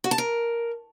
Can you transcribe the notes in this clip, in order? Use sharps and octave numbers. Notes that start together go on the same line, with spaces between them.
F#4
A5
A#4